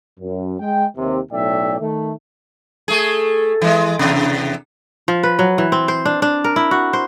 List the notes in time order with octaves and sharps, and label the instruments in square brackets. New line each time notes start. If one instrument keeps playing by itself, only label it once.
[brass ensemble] F#2
G#3 G5
D#2 C3
B1 A2 D5 E5 G5
D#3 A3
[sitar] A3 G#4
E3 G#3
E2 C3
[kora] F3
B4
F#3
E3
C4
C5
D4
D4
A#4
E4
F#4
C5